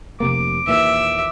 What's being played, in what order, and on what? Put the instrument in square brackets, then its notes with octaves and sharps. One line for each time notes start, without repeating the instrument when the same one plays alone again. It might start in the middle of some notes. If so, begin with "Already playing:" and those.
[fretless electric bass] F1 C3 A#3 [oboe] D6
[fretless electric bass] D#2 A#2 E3 [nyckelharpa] E5